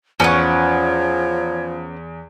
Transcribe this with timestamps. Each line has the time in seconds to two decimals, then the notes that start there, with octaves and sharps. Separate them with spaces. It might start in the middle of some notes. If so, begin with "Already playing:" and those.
0.20 E2 F3 C#4 B4 C#5 F#5